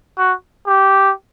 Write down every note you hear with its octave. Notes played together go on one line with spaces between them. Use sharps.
F#4
G4